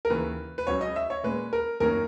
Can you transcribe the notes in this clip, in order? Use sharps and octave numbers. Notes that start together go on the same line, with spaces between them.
A#4
D#2 C#3 E3 B4
B4
C#2 C#3 F#3 C#4 C#5
D#5
E5
C#5
A#2 G#3 C#4 B4
A#4
F#2 D#3 A#3 C#4 A#4